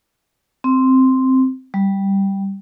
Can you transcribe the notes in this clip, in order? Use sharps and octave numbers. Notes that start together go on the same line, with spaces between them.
C4
G3